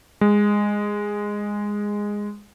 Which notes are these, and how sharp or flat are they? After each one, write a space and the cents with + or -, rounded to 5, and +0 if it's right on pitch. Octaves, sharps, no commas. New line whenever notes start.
G#3 -10